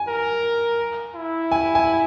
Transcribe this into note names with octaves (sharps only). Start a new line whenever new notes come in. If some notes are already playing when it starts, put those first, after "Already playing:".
Already playing: G#5
A#4
E4
G#5
G#5